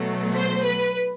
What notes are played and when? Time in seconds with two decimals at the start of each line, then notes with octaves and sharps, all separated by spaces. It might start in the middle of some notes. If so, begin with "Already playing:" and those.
Already playing: B2 F#3 A3
0.37 C5
0.65 B4